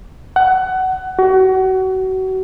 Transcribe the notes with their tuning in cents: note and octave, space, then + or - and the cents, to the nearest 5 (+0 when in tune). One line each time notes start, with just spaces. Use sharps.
F#5 +20
F#4 +30